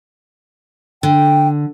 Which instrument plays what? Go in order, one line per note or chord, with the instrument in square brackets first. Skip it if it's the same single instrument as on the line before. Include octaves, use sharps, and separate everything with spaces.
[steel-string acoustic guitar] D3 [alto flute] G5